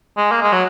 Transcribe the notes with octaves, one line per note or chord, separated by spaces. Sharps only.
G#3
A#3
G#3
F#3